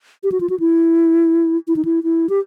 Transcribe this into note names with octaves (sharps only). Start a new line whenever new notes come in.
G4
F#4
F4
F#4
E4
E4
D#4
E4
E4
G4